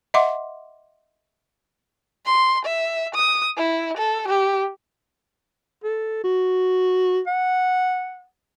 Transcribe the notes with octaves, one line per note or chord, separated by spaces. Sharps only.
D#5 E5 F#5 C6 D6
C6
E5
D#6
E4
A4
G4
A4
F#4
F#5